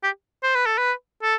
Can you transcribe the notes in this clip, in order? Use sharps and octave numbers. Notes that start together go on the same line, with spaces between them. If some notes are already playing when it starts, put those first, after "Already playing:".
G4
C5
B4
A4
B4
A4